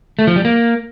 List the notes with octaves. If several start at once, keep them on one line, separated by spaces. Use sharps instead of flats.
A3
F3
G3
A#3